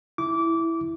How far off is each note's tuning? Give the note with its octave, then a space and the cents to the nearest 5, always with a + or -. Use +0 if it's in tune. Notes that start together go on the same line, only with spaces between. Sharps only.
E4 +0 D6 -20